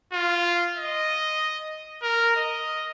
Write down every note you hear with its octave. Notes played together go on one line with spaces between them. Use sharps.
F4
D#5
A#4
D#5